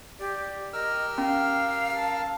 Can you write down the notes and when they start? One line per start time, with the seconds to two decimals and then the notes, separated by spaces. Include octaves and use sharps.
0.19 G4 D5
0.73 G4 A#4 D#5 E6 F6
1.18 C#4 F5
1.93 A5